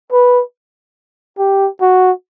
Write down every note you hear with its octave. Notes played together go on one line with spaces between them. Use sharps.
B4
G4
F#4